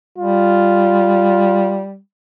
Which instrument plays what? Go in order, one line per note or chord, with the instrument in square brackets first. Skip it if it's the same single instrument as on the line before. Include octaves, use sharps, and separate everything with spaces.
[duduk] G3 [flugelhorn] F4